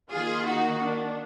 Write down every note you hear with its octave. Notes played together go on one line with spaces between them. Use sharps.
D#3 A#3 F4 G#4
D#4 F#4
D4